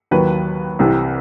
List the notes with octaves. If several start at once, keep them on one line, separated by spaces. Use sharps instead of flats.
D#2 D#3 F#3 B4
C2 C3 E3